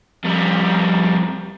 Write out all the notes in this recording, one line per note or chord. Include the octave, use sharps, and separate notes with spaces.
F2 G3